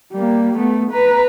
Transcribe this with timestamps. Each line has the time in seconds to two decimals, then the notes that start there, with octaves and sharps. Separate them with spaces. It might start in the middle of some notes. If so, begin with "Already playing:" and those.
0.13 G3 A#3
0.58 A3 B3
0.91 B4 A#5